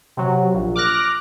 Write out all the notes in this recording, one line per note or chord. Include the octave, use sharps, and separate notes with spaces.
C3 F#3
A#1
D6 F6 F#6 A#6